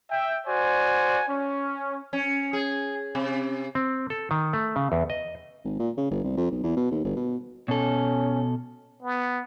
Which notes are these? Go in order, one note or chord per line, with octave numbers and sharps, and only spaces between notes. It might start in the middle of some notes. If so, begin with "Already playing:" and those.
E5 G5
F#4 C5 D5 G#5
C#4
C#4
G#4
C3
C4
A4
D#3
A3
C#3
E2
D#5
G#1
A#2
C#3
G1
C2
F2
B1
E2
B2
D#2
G1
B2
B2 C#4 A4
B3